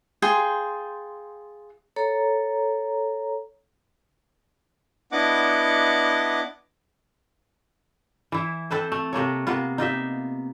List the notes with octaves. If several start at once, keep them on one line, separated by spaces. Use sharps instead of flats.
F4 G#4 G5 C6
A4 C#5 A#5
B3 D4 E4 D#5 F#5 D6
E3 E4
C4 A4 B4 C5
A3
C3 A3 A#3 C#5
C3 A#3 B3 F4
D#4 F4 G4 E5